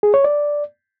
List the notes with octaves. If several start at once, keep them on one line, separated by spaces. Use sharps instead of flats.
G#4
C#5
D5